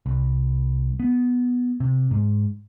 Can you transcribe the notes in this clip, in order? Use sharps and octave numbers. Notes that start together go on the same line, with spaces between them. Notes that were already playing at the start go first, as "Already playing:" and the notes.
C2
B3
C3
G#2